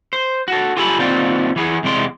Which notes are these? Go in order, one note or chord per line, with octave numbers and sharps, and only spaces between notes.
C5
F#4 A4
F4 G4 A4 G#5 A#5 B5
D#2 B3 C4 F4 D5 G5
E3 B3 G#4
E2 C3 G#3 D5 C6